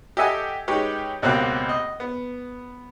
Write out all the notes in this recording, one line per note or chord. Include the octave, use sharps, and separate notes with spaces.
G4 A4 D#5 E5 F#5 G#5
G#3 C#4 D#4 G4 B4 C#5
C#2 B2 A#3 C4 G4 F#6
D#5
B3